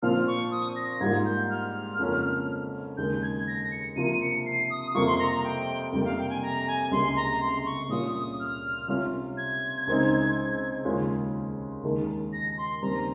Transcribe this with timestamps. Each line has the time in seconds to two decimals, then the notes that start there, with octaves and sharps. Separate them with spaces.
0.02 A#2 F3 C4 F4 F6
0.27 C#6
0.51 D#6
0.76 A#6
1.01 G#2 G3 A#3 F4 G#6
1.25 G6
1.50 F6
1.99 F2 C#3 F3 A#3 C#4
2.97 D#2 C#3 G#3 G6
3.22 G#6
3.47 A#6
3.71 C#7
3.96 C3 F3 A#3 F4 D#7
4.21 C#7
4.46 C7
4.70 D#6
4.94 F2 C3 G3 A#3 F4 C#6
5.07 C6
5.19 A#5
5.31 A#5
5.44 G5
5.92 F2 C3 G3 A#3 G5
6.05 F5
6.18 G5
6.29 G#5
6.42 A#5
6.67 G#5
6.91 C#2 C3 G3 A#3 C6
7.16 A#5
7.41 C6
7.65 C#6
7.89 A#2 G3 C#4 F4 D#6
8.14 D#6
8.39 F6
8.88 C3 G3 C#4 F4
9.37 G#6
9.87 C#2 C#3 G#3 C4 D#4
10.85 D#2 C#3 G#3 C#4 F4
11.83 D#2 D#3 G#3 D#4
12.33 A#6
12.58 C6
12.82 D#2 C#3 G3 C4 A#5